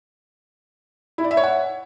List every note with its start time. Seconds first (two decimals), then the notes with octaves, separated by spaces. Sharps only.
1.18 E4
1.24 D5
1.31 E5
1.37 C#5
1.43 F#5